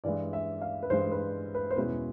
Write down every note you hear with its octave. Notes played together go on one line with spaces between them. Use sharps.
G2 E3 G#3 D5
E5
F5
B4
G2 E3 G#3 C5
B4
B4
C5
E2 B2 G#3 C#4 E4 B4